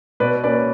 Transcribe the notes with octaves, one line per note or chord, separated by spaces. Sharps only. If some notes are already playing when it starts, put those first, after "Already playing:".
B2 B4 D5
A#3 C#4 B4 D5